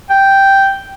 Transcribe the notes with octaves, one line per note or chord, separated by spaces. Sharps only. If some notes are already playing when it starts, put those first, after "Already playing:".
G5